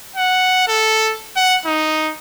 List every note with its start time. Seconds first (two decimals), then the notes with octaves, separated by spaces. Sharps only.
0.16 F#5
0.68 A4
1.36 F#5
1.66 D#4